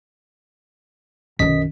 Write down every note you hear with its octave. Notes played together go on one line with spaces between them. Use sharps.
B1 F#2 D#3 D#5 B6